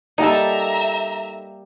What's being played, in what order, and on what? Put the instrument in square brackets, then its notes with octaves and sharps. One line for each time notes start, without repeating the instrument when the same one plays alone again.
[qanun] G3 A#3 [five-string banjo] D#4 A4 [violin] E5 A#5